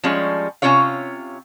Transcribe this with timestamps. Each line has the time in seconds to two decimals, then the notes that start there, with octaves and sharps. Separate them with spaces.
0.03 F3 G3 G#3 C#4
0.62 C3 C#4 F4 C#5 F5